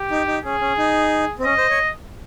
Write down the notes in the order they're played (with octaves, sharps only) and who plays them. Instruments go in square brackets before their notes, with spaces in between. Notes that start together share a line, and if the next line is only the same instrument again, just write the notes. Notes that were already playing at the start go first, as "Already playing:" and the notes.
Already playing: [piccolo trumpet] G4
[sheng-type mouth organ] D#4
D#4
[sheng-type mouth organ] C#4 [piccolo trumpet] G#4
[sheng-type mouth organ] C#4
D#4
C4
[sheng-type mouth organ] C#4 [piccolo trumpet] D#5
[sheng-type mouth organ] C5
C#5